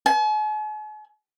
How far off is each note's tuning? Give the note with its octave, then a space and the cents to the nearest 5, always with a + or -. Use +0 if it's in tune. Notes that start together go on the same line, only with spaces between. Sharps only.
G#5 +45